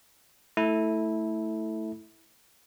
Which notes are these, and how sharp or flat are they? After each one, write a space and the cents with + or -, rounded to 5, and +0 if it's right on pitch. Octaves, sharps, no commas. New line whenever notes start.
A3 +5 E4 -15 A4 +0